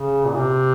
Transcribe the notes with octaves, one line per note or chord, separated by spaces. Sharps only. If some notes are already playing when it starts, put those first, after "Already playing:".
Already playing: C#3
A#2
C3